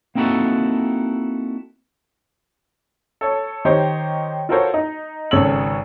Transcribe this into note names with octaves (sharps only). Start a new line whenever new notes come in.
A#3 C4 D#4 E4 F#4 A4
A4 C#5
D#3 D#4 G4 C5 C#5
F4 F#4 A4 A#4 C5 C#5
D#4
G#1 C#3 A4 C#5 E6 F#7